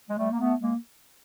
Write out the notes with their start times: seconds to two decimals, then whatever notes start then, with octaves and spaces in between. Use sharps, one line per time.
0.10 G#3
0.18 G3 A3
0.31 A#3
0.39 A3 B3
0.61 G#3 A#3